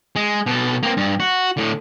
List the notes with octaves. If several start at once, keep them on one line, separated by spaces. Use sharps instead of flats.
G#3
B2 A4
A#3 C4
G2
F#4
A2 D3